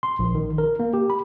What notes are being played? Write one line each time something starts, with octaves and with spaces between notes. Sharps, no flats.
C6
A#1
D#3
A#4
A#3
G4
B5